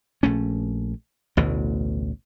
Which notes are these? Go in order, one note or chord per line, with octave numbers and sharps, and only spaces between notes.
A#1 A3 C#4
A1 D2 B2 E3